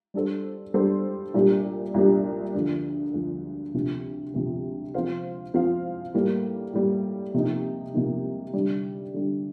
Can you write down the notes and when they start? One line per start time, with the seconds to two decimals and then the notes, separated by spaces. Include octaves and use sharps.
0.14 G3 D4 A4 C5
0.74 G3 D4 A4 C5
1.34 C2 A#2 G3 D4 G4
1.94 C2 A#2 G3 D4 G4
2.55 D2 D3 F3
3.14 D2 D3 F3
3.74 D2 C3 F3
4.34 D2 C3 F3
4.94 F3 C4 F4 C5 F5
5.54 F3 C4 F4 C5 F5
6.14 A2 G3 A#3
6.73 A2 G3 A#3
7.34 C3 F3 A#3 D#4
7.94 C3 F3 A#3 D#4
8.53 D3 G3 D4
9.14 D3 G3 D4